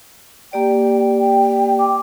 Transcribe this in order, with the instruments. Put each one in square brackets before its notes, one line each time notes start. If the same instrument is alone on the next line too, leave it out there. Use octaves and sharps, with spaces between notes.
[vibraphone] A#3 G4 D5 [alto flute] G5
[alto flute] G5
[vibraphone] D6